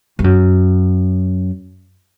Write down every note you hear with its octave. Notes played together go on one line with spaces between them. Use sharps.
G2
F#2